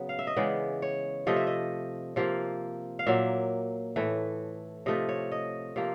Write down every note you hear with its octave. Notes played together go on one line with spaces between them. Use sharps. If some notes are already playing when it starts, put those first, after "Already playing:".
Already playing: C#3 F#3 B3
F5
E5
D#5
C#3 E3 G#3 B3 D5
C#5
C3 F3 A3 D#5
E5
D#5
C3 F3 A#3
F5
A#2 F#3 A#3 E5
A2 E3 A3
C3 F3 A3 D#5
C#5
D#5
C3 F3 A#3